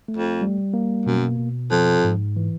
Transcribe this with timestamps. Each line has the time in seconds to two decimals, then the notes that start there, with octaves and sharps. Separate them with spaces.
0.08 A3
0.17 F2
0.41 G3
0.74 A#3
1.06 F#2 B2
1.39 B2
1.71 F2 F3
2.04 G#2
2.36 E3